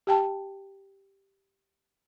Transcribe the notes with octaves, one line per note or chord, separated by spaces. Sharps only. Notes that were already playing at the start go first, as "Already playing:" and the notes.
G4 G5 A5